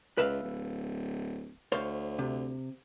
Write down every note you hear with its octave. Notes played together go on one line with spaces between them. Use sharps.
C#2 B4 E5 F5
D1
D2 C5 C#5 F5
C3